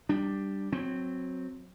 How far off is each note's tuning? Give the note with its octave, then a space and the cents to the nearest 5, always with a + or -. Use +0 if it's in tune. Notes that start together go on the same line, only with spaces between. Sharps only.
G3 +0 D4 +5
F#3 -15 C4 +0